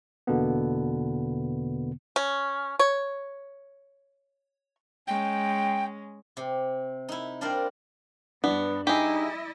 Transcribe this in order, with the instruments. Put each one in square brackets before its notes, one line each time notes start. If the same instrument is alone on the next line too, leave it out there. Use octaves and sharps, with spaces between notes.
[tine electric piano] E2 B2 D3 A#3 B3
[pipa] C#4
C#5
[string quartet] G#3 C#4 [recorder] G5
[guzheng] C3
D#4 E4
G3 D4 F4 A#4 C5 D5
[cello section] G2 [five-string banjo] B3 [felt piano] D4
[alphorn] D#4 [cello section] E4 D#5 [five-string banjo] G4 G#4